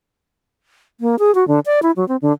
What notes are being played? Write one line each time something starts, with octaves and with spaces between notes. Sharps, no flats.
A#3
G#4
F#4
D3
D5
E4
F#3
C4
D3